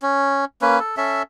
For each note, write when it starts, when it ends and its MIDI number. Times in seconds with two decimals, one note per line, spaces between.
0.02 0.45 61
0.62 0.79 58
0.62 0.79 61
0.62 0.79 71
0.79 0.96 69
0.97 1.22 61
0.97 1.22 69
0.97 1.22 76